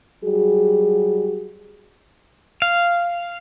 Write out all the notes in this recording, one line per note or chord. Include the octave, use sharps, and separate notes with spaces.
F#3 G3 F#4 G#4
F5